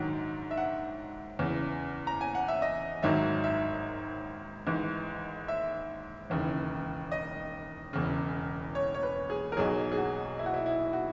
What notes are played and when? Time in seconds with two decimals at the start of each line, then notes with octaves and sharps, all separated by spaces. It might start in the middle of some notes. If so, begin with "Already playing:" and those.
Already playing: A#1 G#2 D#3 F#3 F#5
0.51 E5
0.57 F#5
1.39 E2 C#3 E3
2.07 A#5
2.21 G#5
2.35 F#5
2.48 E5
2.62 D#5
3.03 G#1 G#2 D#3 F#3 E5
3.44 E5
4.67 G#1 G#2 E3
5.48 E5
6.30 E1 D#2 C#3 E3
7.12 D#5
7.93 E1 E2 C#3
8.75 C#5
8.94 C#5
9.03 B4
9.30 G#4
9.52 A#4
9.57 B1 B2 F#3 G#4
9.92 G#4
9.98 F#4
10.39 E4
10.46 F#4
10.54 E4
10.66 E4
10.93 F#4